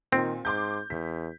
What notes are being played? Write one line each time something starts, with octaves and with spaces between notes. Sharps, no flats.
A#2 D#3 C4
G#2 C6 D6 G6
E2 B6